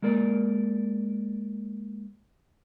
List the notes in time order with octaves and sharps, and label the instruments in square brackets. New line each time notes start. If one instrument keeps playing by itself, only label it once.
[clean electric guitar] G#3 A#3 A#4 D5